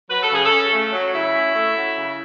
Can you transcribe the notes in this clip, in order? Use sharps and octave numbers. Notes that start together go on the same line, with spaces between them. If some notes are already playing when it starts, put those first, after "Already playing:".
F#3 B4
A4
C#3 G#4
A4
C#4
A3
F#3
C#3 E4
C#4
A3
F#3
C#3